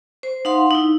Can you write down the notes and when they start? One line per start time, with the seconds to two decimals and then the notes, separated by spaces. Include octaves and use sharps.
0.23 C5
0.45 D#4 F5 F#5 C6
0.71 D#4 E4